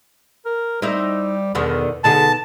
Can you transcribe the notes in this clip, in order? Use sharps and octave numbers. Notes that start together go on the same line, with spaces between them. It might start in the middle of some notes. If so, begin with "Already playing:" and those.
A#4
G3 C4 D#4 E4
E2 B2 D3 D#3
B2 D3 D#4 G#4 A5